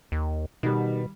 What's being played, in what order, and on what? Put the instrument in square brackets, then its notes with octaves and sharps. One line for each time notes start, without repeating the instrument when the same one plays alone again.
[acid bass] D#2
[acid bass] B2 [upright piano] D#3 G3